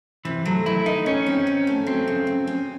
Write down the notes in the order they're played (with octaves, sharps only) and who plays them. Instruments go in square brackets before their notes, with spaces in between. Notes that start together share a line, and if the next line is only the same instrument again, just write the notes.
[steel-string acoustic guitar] C3 [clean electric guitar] E3
[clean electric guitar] F#3 [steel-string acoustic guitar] A3
[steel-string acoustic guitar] D#3 [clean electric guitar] E4
[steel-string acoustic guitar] D#3 [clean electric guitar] D#4
[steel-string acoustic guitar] D#3 [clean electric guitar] C#4
[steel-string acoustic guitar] C4
D#3
A3
[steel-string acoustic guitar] F#3 [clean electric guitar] C4
[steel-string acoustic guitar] C#3
C#3
C#4